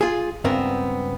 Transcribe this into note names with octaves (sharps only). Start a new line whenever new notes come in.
F4 G#4
C#2 G2 B3 C4 A#4